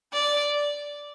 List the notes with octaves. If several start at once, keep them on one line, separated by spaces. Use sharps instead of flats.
D5